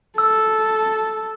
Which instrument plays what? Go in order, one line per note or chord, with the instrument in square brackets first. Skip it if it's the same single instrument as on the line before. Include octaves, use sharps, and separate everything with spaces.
[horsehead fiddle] A4 [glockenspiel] E6